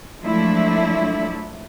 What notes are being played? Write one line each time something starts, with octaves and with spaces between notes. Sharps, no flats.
F3 F#3 G#3 A3 D4 E4